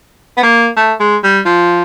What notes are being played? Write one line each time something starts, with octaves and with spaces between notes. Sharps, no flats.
B3
A#3
A3
G#3
G3
F3